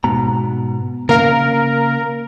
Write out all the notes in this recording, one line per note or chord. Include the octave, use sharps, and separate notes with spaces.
G#2 B2 A#5
C#3 A#3 A#4 F5